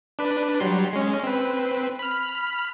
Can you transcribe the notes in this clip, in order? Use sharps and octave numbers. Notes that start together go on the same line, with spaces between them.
D4 B4
F#3 G3 C6
G#3 C#4
C4 B4
B5 F6